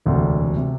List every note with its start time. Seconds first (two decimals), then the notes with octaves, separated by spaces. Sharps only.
0.06 E1 D2 C3
0.57 C3